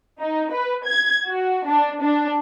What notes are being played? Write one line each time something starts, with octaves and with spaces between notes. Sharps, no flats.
D#4
B4
G#6
F#4
D4
D4